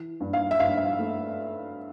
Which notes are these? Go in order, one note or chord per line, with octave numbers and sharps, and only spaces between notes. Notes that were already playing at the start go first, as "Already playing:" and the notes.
Already playing: E3
G2
F5
E5
G2 F5
E5
F5
A3